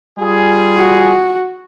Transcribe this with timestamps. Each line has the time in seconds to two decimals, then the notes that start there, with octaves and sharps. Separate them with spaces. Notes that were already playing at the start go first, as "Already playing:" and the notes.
0.18 G3 F4 G#4
0.76 F#4